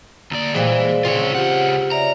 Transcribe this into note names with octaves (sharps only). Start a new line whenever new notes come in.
D2 A#3 D5
A#2 E3 G3 G#3 C5 F5
C#3 C4 F4 C#5
C#2 F4 G4 F#5
C#5 D5 E5 A#5